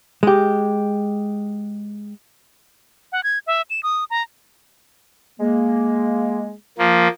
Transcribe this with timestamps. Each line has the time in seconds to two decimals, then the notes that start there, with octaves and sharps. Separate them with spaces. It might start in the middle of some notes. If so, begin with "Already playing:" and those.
0.23 G#3 G4
3.12 F#5
3.24 G#6
3.47 E5
3.70 E7
3.83 D#6
4.10 A#5
5.40 G#3 A#3
6.78 F3 A#3